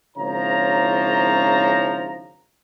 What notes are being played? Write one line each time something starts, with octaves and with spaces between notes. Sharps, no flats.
G#1 C#3 F3 E4 C#5 A#5